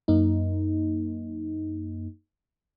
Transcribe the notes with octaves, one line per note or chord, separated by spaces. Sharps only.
F#2 A#3 D#4